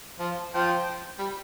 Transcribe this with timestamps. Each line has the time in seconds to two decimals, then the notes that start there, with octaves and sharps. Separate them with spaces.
0.19 F3
0.53 F3 F4 C5 G5
1.19 G3